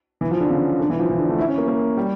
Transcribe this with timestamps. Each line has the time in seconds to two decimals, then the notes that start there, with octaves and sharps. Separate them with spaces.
0.21 E3
0.31 F3
0.40 D3
0.50 C#3
0.80 D3
0.90 E3
0.99 F3
1.09 E3
1.19 D3
1.29 A3
1.39 E4
1.48 C#4
1.58 A#3
1.68 A#3
1.97 G3